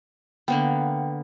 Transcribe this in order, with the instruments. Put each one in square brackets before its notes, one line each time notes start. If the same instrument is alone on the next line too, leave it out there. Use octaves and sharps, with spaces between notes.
[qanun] D3 A#3 B3 [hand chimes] B4 F#5 G5